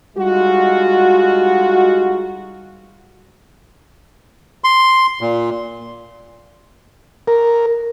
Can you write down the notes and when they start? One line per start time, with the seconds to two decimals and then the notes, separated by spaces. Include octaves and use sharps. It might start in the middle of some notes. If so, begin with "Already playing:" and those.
0.17 G3 G#3 D#4 F4 F#4
4.64 C6
5.21 A#2
7.27 A#4